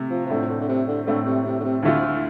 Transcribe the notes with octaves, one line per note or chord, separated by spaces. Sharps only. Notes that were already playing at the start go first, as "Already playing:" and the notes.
Already playing: C3 A3
F3
F3
A2 D3 A3 C4
D3
D3
C3
D3
A2 D3 A3 C4
C3
C3
D3
C3
D2 A2 D3 A3 F4